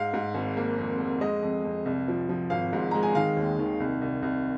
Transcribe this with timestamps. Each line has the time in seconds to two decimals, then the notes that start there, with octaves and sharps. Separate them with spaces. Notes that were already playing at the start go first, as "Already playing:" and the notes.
Already playing: G#2 F5
0.14 G#2
0.35 G#1
0.57 A#3
0.78 F2
1.00 F2
1.21 G#3 D#5
1.43 F2
1.65 F2
1.86 C2
2.08 F3
2.29 F3
2.50 G#1 F5
2.73 G#2
2.91 G#3 A#5
3.03 G#5
3.15 D#3 F5
3.37 D#2
3.59 D#3
3.80 C2
4.01 C2
4.22 C2